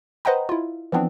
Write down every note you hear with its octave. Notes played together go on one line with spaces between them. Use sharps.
B4 C5 D#5 F#5 G5 A#5
E4 F4
E3 F3 B3 C4 D4